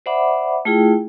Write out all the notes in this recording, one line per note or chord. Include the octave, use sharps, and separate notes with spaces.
C5 D5 E5 F#5 B5 D6
A3 E4 F4 G#4 G5